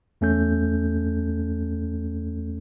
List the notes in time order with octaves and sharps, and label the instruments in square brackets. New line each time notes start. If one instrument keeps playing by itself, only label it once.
[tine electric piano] E2 A3 C#4 A4 G6